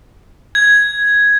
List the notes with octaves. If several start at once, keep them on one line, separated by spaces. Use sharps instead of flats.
G#6